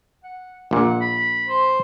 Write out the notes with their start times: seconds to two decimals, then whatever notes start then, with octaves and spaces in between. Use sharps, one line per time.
0.23 F#5
0.71 A#1 A#2 F#5
1.01 B5
1.48 C5